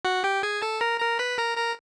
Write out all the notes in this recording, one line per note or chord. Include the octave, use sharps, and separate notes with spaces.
F#4 F#5
G4 G5
G#4 G#5
A4 A5
A#4 A#5
A#4 A#5
B4 B5
A#4 A#5
A#4 A#5